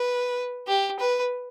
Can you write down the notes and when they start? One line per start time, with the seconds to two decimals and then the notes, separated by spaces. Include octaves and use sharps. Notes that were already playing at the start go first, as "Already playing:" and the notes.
Already playing: B4
0.68 G4
0.99 B4